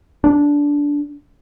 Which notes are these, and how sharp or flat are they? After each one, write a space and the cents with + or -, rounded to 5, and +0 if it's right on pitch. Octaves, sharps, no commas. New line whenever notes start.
D4 -15